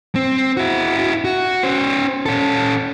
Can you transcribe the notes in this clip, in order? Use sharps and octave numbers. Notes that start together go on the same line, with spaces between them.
C4
E4 F#4
F#4
C#4 C5
C#4 A4